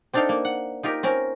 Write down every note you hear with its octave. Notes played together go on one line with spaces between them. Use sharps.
C4 D4 D#4 A4 F5 G5
A#3
F#5
D#4 F4 G4 A#4
C4 C#4 A#4